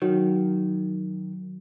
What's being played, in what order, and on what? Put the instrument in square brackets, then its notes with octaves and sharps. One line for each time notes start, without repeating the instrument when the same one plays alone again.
[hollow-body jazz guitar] D#3 [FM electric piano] F#3